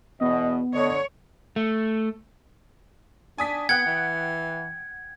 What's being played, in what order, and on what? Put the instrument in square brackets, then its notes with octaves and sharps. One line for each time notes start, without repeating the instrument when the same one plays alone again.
[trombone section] E2 B2 [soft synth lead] B3 [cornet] D#5
[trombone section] D3 [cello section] C#5 [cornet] D#5
[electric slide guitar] A3
[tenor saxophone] D4 [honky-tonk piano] G#5 D#6 B6
[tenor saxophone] B3 [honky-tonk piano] F#5 G5 F#6 [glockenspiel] G#6
[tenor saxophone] E3